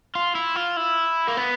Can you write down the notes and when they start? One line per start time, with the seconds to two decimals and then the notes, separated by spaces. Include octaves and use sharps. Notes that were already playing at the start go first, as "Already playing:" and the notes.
0.15 F4
0.35 E4
0.56 F4
0.77 E4
1.28 A#3
1.37 B3